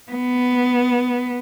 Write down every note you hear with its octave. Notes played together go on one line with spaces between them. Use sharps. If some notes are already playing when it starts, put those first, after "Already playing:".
B3